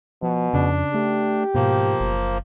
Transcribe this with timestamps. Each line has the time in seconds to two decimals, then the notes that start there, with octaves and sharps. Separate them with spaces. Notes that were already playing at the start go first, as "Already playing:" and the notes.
0.23 B2 F3
0.54 F2 C#3 D4
0.94 A3 G4
1.55 G#2 B2 F3 A#3
2.00 F#1